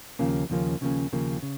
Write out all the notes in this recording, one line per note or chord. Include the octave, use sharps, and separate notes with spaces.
D#2 C#3 F3 A#3 C#4
D#2 C#3 F3 A#3 C#4
D#2 C#3 F3 A#3 C#4
D#2 C#3 F3 A#3 C#4
C#3